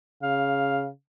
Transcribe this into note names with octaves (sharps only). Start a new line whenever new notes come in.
C#3 F5